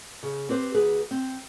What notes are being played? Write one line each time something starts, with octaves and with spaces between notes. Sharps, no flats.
C#3
C4 G4 B4 C5
D2 G#4 B4
C4